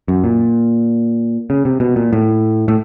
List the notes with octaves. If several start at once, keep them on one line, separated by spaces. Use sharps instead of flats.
F#2
A#2
C#3
C3
B2
A#2
A2
A2